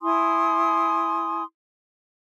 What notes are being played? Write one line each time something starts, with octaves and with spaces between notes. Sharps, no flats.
E4 G#5 C6 D#6